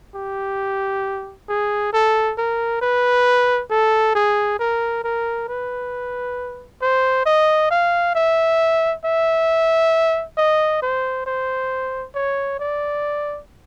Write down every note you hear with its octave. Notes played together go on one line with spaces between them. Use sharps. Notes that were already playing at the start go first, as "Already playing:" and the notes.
G4
G#4
A4
A#4
B4
A4
G#4
A#4
A#4
B4
C5
D#5
F5
E5
E5
D#5
C5
C5
C#5
D5